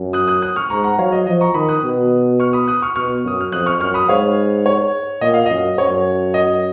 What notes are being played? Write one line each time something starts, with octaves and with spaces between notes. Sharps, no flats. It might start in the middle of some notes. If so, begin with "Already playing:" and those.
Already playing: F#2
D#6 F#6
D#6 F#6
D#6 F#6
C#6 F6
G#2 A#5 C#6
F#5 A#5
F#3 C#5 F5
D#5
F3 D#5
A#5 C#6
D#3 B5 D#6
D#6 F#6
B2
C#6 F6
B5 D#6
D#6 F#6
C#6 F6
B2 C#6 F6
F#2 D#6
F6
F2 D#6 F#6
C#6 F6
F#2 C#6 F6
B5 D#6
G#2 C#5 F5
C#5
A#2 D#5
F5
F#2 D#5
F#2 C#5
D#5